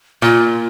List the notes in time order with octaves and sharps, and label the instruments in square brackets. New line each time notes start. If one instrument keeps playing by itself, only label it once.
[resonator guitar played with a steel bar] A#2 [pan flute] F4